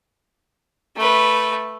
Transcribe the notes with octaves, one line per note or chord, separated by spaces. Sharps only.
A3 B4